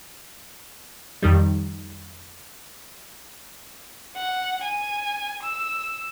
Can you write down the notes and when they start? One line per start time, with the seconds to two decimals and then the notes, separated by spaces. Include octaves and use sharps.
1.23 F2 D#3 G3
4.16 F#5
4.64 G#5
5.43 E6